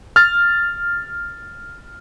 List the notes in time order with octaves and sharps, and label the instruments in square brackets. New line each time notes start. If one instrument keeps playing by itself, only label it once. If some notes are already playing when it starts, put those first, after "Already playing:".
[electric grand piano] F6 A6